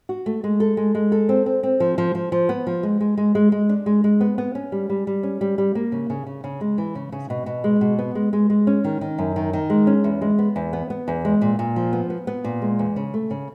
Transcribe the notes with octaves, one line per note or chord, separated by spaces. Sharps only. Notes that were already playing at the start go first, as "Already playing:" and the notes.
F#4
A3
G#3
A4
G#3
G#3
A4
C4
C4
C4
F3
F3
F3
F3
B3
F3
G#3
G#3
G#3
G#3
G#3
D4
G#3
G#3
B3
B3
C#4
G3
G3
G3
C#4
G3
G3
A#3
C#3
C#3
C#3
C#3
G#3
E3
C#3
C#3
B2
B2
G#3
B2
B3
G#3
G#3
G#3
C#4
D#3
D#3
F#2
D#3
D#3
G#3
C#4
E2
G#3
B3
E2
B3
B3
E2
G#3
A#2
A#2
F3
B3
B3
B3
A#2
G#3
E2
C#3
A3
C#3